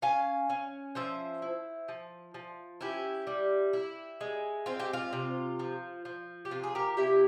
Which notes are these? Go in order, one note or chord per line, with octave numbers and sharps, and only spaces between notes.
C#4 F5 G#5
C#4
F3 C5 E5
E4
F3
F3
C#4 E4 G4
G3
E4
G#3
C4 F4
G4
F4
C3
F3
F3
G4
C3 F4
G#4
G4 A#4
C3 E4 G4